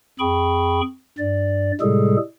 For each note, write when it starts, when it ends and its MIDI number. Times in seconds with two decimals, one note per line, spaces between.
0.19 0.81 41
0.19 0.81 68
0.19 0.81 79
0.19 0.81 83
0.19 0.81 85
1.18 1.72 43
1.18 1.72 74
1.81 2.17 45
1.81 2.17 48
1.81 2.17 55
1.81 2.17 56
1.81 2.17 68
1.81 2.17 69